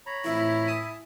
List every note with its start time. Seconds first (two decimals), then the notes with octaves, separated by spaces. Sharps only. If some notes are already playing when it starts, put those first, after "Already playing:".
0.06 C#5 A#5 B5
0.24 F2 A2 E3 E4
0.67 G#5 A5 D#6